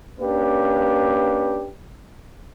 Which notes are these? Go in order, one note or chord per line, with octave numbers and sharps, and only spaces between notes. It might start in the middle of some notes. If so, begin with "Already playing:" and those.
A#3 C#4 D4 G4 B4